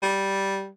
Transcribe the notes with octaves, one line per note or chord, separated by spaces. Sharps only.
G3